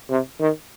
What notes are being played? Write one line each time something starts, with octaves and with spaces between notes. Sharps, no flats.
C3
D#3